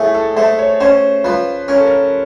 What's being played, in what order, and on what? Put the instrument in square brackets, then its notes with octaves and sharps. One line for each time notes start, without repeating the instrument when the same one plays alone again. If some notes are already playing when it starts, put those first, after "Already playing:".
Already playing: [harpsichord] A2 A3 [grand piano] G#4
[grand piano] A4
[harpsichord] A3 [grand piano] C5
[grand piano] C#5
[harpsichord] C#4 [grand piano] C5
[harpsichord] F3 [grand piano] B4
[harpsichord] C#4 [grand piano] A#4
[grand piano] A4
A#4